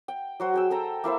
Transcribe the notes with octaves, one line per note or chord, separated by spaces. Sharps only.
G5
F#3 F#4 C5
G#4 G5 E6
A4 G5 A#5
A#3 E4 C5 A5